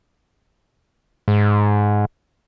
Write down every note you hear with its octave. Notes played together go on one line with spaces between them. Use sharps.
G#2